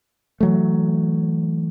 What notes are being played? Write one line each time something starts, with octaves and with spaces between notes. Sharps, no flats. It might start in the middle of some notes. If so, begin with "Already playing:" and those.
E3 F#3 A3